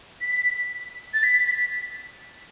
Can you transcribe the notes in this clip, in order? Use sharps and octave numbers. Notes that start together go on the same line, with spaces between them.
B6
A6
B6